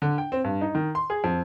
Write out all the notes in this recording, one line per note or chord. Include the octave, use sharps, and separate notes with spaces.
D3
G5
C4
G2
D#4
D#3
C6
G#4
F2